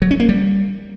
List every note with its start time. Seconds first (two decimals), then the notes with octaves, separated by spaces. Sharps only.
0.02 F#3
0.11 C#4
0.20 A#3
0.29 G3